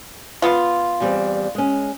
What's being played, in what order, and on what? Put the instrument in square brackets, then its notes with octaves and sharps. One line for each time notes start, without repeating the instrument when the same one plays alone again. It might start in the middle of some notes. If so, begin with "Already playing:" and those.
[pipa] B3 F4
[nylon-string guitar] E2 G3 C4
G#3 C#4